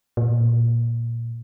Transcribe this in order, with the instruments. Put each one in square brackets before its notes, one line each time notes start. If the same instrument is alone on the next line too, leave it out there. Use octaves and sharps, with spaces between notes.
[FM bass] A#2